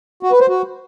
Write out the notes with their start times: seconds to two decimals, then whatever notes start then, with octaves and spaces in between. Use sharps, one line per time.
0.23 F#4
0.32 B4
0.40 C5
0.49 F#4